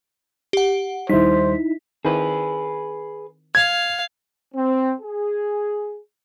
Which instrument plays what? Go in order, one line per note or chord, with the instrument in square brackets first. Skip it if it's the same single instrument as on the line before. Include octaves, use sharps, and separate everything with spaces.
[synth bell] G4 F#5
[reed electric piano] D#2 G3 [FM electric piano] D#4 E4 [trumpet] C5 [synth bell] B6
[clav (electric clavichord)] D#3 C4 E4 [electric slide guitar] G#4 B4
[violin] F5 [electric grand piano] G#6
[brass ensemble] C4
G#4